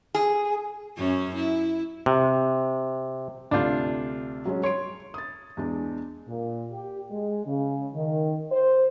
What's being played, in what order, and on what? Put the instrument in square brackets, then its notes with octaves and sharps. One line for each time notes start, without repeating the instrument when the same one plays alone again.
[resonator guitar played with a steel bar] G#4
[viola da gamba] F#2 C#4
E4
[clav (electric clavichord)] C3
[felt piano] D2 C3 G6 [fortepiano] D4 F4
[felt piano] F#3 G#3 C#4
[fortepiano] C#5 [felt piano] C6 D7
[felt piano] D#6 A6
E2 G#3 D4
[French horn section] A#2
G4
G#3
C#3
D#3
C5